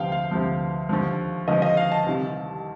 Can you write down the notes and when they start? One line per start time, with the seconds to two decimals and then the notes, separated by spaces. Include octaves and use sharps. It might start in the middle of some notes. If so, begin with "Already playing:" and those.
Already playing: D2 C3 F3 F5 G5
0.12 F5
0.31 D2 C3 F3
0.89 D#2 D3 F3
1.48 D#2 D3 F3 D#5
1.62 D#5
1.77 F5
1.92 A5
2.06 C2 C3 D#3